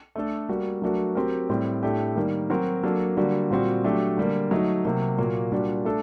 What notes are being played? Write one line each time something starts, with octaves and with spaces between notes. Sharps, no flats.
A3 D4 A4
G3 A#3 F#4
F#3 A3 D4 F#4 A#4
F#3 C4 G4 A#4
A2 G3 C4
A2 A3 D4 G4
D#3 G3 A#3
F#3 C4 F#4 A#4
F#3 A#3 D4 A4
D3 G3 A#3 F#4
A#2 G3 C4 F#4
F#3 A3 D4 G4
D3 G3 A#3
F#3 A3 D#4
C3 F#3 A#3
A#2 F#3 A#3
A#2 G3 D4 F#4
A3 D4 A4